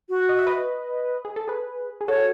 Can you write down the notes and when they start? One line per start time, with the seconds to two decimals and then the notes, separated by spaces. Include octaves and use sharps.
0.09 F#4
0.29 D#5
0.39 E5
0.47 B4 D#5
1.25 G#4
1.36 A4
1.48 G#4 B4
2.01 G#4
2.08 F#4 A4 C#5